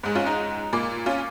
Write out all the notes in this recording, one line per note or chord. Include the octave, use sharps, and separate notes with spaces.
G#2 G#3
C#4 F4
D#4
A#2 A#3
C#4 F4